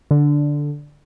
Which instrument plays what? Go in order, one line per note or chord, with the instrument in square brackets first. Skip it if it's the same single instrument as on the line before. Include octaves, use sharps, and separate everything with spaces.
[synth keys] D3